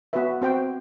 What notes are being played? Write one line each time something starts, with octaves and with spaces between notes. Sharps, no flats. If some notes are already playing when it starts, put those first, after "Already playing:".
B3 F#4 B4 E5
C4 F#4 C5 G5